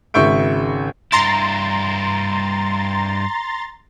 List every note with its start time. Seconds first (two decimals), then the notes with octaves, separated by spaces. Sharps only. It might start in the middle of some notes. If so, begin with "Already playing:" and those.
0.14 G#1 C#3 E5 C#6 G6 D7
1.12 G2 E4 A#5 C6 A6